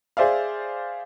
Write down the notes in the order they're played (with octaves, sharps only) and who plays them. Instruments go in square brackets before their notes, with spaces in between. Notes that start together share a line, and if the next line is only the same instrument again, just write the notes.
[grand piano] G#4 C5 D5 E5 F5